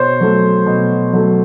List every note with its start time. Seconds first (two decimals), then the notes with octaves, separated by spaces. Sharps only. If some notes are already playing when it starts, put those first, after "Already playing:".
Already playing: B2 C5 C#5
0.21 F#3 A3
0.66 B2
1.13 F#3 A3